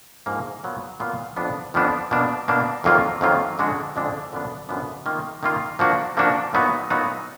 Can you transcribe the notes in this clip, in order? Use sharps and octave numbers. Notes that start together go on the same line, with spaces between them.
G#2 F3 A#3
A#2 F#3 B3 F4
A#2 F#3 B3 F4
F2 F3 B3 D4
F2 F3 B3 D4
B2 A#3 D4
B2 A#3 D4
F2 D#3 F#3 A#3 F4
F2 D#3 F#3 A#3 F4
F2 D3 G#3 D4 F#4
F2 D3 G#3 D4 F#4
F#2 D3 F3 B3 D4
F#2 D3 F3 B3 D4
D#3 A#3 F4
D#3 A#3 F4
F3 A#3 D4 F#4
F3 A#3 D4 F#4
A#2 F#3 B3 D#4 F#4
A#2 F#3 B3 D#4 F#4